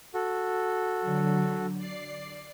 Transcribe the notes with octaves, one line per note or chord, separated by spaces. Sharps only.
F#4 A4
D3 F#3
D5 C7